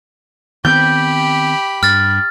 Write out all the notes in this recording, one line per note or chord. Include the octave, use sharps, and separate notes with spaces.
D#3 B3 C4 G4 B5 G6
G2 F6 A6